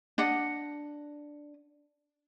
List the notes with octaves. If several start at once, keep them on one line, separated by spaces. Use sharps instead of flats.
D4 D#5 F#5